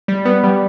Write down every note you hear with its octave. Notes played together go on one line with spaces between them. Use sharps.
G3
B3
G3